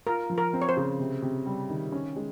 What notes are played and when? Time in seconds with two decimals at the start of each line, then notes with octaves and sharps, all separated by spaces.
0.07 F4 A#4
0.30 F3
0.38 A#4
0.53 C4
0.62 C#5
0.69 C5
0.77 C#3
1.00 C3
1.22 C3
1.46 G3
1.69 D#3
1.92 C#4
2.16 G#3